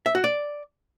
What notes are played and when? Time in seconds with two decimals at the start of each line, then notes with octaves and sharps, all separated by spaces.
0.06 E5
0.15 F#4
0.24 D5